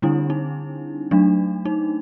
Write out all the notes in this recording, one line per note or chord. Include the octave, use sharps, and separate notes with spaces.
D3 G3 C4 D4 E4
D#4
F#3 A3 D4
D#4